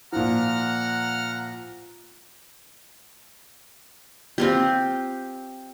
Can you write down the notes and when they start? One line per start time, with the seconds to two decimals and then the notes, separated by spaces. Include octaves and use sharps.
0.13 A#2 F3 F#5 A#5 F6
4.38 C4 F4 G4